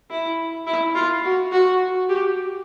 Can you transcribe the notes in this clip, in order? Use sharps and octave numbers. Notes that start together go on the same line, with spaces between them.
E4
E4
F4
F#4
F#4
G4